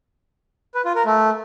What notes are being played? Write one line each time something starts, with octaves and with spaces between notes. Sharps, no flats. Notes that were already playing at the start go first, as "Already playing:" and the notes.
B4
F4
A#4
A3